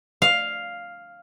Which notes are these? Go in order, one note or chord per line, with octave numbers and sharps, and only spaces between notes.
F5